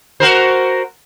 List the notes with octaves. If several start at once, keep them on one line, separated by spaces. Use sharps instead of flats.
F#4 A#4 C5